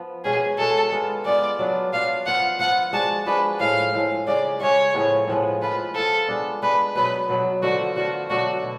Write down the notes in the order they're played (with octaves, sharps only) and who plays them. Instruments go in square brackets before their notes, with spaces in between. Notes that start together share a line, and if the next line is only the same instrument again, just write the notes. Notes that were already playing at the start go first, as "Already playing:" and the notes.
Already playing: [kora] F3 B3
[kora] B2 G#3 C#4 F#4 [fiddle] G#4
[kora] B2 G#3 C#4 F#4 [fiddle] A4
[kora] G#3 B3 F4
[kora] G#3 B3 F4 [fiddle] D5
[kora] F#3 B3 D4 F4
[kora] F#3 B3 D4 F4 [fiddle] F5
[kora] F3 B3 F4 [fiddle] F#5
[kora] F3 B3 F4 [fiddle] F#5
[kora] F3 G#3 D4 F#4 [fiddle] A5
[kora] F3 G#3 D4 F#4 [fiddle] B4
[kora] A2 F3 G#3 [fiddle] F5
[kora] A2 F3 G#3
[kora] C#3 G#3 C#4 [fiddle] D5
[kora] C#3 G#3 C#4 [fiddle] C#5
[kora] A2 F3 G#3 B3
A2 F3 G#3 B3
[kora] F3 B3 F4 [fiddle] B4
[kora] F3 B3 F4 [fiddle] A4
[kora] G#3 B3 D4
[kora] G#3 B3 D4 [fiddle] B4
[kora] B2 F#3 B3 [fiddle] B4
[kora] B2 F#3 B3
[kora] D3 F3 A3 F4 [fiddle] F#4
[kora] D3 F3 A3 F4 [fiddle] F#4
[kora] B2 F#3 A3 D4 [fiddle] F#4
[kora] B2